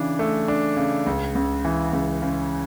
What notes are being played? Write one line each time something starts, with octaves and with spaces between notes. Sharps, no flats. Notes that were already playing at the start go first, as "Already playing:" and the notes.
Already playing: C#3 E3 D4
A3
D4
C#3
C#2
C#2
E3
C#2
C#3